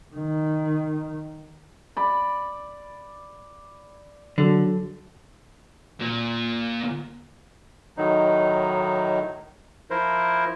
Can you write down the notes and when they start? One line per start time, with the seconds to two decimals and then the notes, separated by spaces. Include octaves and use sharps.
0.15 D#3
1.97 D5 B5
4.38 D3 F#3 A4
6.01 A#2
7.97 A2 D#3 F#3 D#4
9.90 F3 E4 A#4 C5